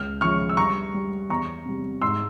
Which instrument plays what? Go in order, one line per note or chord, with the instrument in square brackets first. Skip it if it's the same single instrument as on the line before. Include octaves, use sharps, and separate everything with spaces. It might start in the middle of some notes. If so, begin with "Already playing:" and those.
Already playing: [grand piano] C#2 F6
C#3 F3 C#6 F6
E6
G2 A#5 C#6
G3
E2 A#5 C#6
C3 G3
G#2 C6 E6